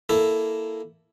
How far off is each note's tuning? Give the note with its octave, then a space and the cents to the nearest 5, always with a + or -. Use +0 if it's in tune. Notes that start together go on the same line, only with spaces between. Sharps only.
A#3 +0 E4 +0 A4 +0